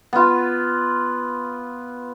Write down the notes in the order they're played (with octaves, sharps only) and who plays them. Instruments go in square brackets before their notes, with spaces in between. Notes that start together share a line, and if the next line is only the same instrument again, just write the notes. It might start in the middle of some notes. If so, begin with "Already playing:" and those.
[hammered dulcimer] B3 F4